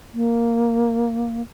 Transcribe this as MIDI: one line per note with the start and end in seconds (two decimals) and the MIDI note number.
0.14 1.42 58